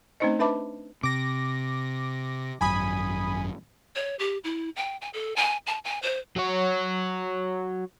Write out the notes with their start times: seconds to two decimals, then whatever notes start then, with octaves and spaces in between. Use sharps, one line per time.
0.20 A3 C4 C#4 D#4 C5 D#5
0.39 D4 B4 E5 A5 B5 D6
1.03 C3 D6 A#6
2.61 G#1 F#2 G#5 B5 D#6
3.96 C#5
4.19 G4
4.44 E4
4.76 G5
5.01 G#5
5.14 A4
5.36 G#5
5.67 A5
5.85 G#5
6.02 C5
6.36 F#3 C#5